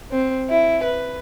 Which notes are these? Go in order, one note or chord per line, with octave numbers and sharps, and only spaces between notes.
C4
E4
B4